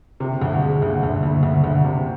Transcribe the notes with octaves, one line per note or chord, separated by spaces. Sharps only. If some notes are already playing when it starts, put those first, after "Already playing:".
C3
D2
G#3
D2
D2
D2
D2
D2
C3